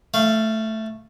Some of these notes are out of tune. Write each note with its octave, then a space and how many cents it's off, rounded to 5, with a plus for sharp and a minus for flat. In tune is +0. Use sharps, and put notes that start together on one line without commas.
A3 +0 F5 -20